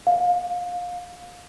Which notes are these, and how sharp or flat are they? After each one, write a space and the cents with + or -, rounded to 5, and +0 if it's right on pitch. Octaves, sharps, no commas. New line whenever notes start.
F5 +25